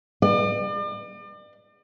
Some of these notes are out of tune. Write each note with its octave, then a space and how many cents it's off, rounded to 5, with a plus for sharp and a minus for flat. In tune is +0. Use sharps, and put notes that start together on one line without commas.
D5 +40